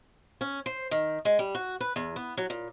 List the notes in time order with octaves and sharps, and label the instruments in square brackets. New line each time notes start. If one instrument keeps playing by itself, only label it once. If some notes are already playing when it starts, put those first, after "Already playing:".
[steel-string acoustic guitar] C#4
C5
D#3
G#3
G3
F#4
B4
E2
B3
F#3
A#2